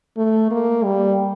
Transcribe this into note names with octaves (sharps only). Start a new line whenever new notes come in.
A3
A#3
G3